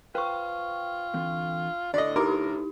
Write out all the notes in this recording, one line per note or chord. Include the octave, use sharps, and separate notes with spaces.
F4 B4 C5 F5 G5 C#6
D3 E3 C4
A2 D3 D5 D#5
D#4 E4 G4 A#4 D6